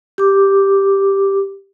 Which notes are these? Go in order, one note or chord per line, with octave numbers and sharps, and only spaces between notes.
G4 D6